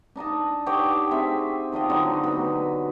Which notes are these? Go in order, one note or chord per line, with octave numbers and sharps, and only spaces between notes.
D4 D#4 D#5 A5
G4 C#5 D#5 F#5
C4 G#4 E5
D#3 D4 F4 D#5
D3 F#3 D#4
B2